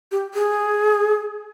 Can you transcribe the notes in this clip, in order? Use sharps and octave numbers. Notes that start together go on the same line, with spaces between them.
G4
G#4